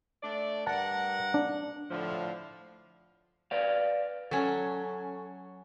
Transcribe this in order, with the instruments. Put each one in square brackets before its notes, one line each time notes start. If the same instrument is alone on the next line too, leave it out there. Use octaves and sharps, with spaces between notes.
[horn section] A3 D4 D5
[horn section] G2 A#4 F#5 [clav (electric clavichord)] A5
[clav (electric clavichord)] D4
[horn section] A2 D3 F3
[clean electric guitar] B4 D5 F5
[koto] F#3 C#4 [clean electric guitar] A4